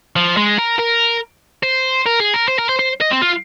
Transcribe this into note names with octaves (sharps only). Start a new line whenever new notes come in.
F3
G#3
A#4
A#4
C5
A#4
G#4
A#4
C5
A#4
C5
C5
D#5
C4
F4